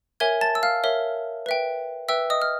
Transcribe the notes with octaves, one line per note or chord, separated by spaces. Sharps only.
A#4 C#5 E5 G#5 G#6
A5 A6
E6
F5 F6
A#4 C#5 E5
B4 E5 G5
B4 E5 G5 E6
D#5 D#6
F6